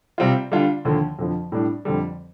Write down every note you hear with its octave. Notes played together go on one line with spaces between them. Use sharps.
C3 G3 C4 F4
D3 G3 D4 F4
D#2 D3 F3
F2 D3 F3
A2 G3 D4
F2 D3 G3